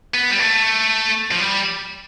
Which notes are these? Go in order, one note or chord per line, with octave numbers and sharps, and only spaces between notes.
B3
G3
A3
F3
G3